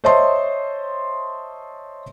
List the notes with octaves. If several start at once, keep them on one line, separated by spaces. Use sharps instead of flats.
C5 C#5 D#5 E5 A5 C6